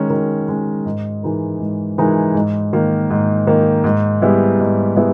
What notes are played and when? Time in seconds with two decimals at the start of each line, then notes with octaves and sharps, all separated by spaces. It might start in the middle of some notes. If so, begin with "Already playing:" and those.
Already playing: D#3 G#3 C#4
0.10 D#3
0.48 G#3 C#4
0.86 G#2
1.23 E3 G#3 D#4 A#4
1.60 G#2
1.98 E3 G#3 D#4 A#4
2.34 G#2
2.73 D#3 A#3
3.10 G#2
3.47 D#3 A#3
3.84 G#2
4.22 G3 B3 E4 G#4
4.60 G#2
4.96 G3 B3 E4 G#4